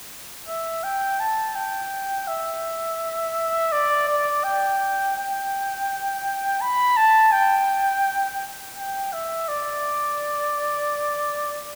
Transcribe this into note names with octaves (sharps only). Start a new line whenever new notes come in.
E5
G5
A5
G5
E5
D5
D5
G5
G5
B5
A5
G5
G5
E5
D5